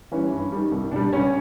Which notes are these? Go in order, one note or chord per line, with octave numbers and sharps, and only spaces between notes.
E3 G3 C#4
G2
D#3 G3
C2
B2 G3 D4
C#2 C#4